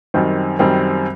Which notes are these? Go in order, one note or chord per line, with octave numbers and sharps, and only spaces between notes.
F#2 D#3 G3 C4
F#2 D#3 G3 C4